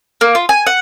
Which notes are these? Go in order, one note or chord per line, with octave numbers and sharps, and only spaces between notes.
A#3
F4
G#5
F#5